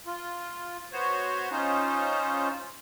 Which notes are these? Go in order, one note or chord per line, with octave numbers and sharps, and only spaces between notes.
F4
B3 F#4 C5 C#5
C#4 D#4 F4 C5